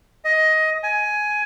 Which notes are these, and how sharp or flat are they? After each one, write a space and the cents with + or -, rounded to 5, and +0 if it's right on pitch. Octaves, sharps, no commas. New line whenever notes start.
D#5 +15
G#5 +15